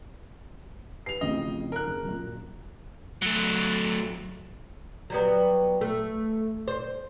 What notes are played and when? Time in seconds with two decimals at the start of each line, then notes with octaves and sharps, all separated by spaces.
1.06 G4 B4 C7 F7
1.21 A1 F2 C#3 D#5
1.72 A#4 F#6
1.87 F#1
2.05 F#2 A#2
3.22 F#3 A3
5.10 F#3 G3 B3
5.81 A3
6.68 C5